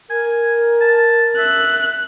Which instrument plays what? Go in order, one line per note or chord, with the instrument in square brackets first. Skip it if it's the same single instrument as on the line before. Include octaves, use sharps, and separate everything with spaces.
[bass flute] A#4 [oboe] G#5
[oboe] A5
[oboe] E5 [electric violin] F#6